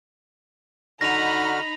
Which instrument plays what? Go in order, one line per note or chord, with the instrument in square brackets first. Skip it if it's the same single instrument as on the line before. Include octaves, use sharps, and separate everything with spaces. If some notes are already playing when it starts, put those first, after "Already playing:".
[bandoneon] D3 F#4 F6 [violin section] D#4 A#5 B5 [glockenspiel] A#6 F7